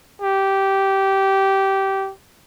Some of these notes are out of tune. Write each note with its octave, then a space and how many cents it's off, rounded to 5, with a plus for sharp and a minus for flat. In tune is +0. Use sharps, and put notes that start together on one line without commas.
G4 -15